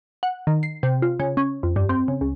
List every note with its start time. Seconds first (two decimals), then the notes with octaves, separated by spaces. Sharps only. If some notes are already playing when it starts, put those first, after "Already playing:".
0.23 F#5
0.47 D#3
0.63 C7
0.83 C3
1.02 F4
1.20 C#3
1.37 C#4
1.63 F2
1.76 G2
1.89 C4
2.08 C#3
2.21 C#2